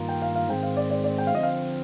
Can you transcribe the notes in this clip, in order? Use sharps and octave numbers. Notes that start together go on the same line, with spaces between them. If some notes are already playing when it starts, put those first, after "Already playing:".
Already playing: G2 D#3 A#3 F4 A#4
G5
F5
F5
G#2 D#3 G#3 C4 G5
F5
D5
D5
D5
G5
F5
D3 F3 C4 D#5
F5